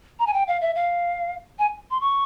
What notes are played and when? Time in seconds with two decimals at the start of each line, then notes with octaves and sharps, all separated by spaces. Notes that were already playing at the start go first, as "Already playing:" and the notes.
0.19 A#5
0.27 G#5
0.33 G5
0.48 F5
0.61 E5
0.75 F5
1.59 G#5
1.91 C6
2.01 C#6